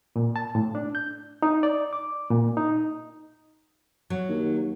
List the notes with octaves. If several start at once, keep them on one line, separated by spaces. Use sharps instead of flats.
A#2
A5
A2
D4
G6
D#4
D5
D6
A#2
D#4
F#3
D#2